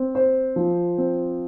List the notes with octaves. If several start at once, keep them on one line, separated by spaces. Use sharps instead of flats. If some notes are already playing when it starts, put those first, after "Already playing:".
Already playing: C4
C5
F3
C4